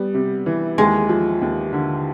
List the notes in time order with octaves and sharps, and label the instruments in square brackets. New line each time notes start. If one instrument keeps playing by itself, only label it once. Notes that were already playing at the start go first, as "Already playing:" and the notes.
Already playing: [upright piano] G3 B3
C3
E3
[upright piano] D#2 [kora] G#3
[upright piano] F3
D#2
D3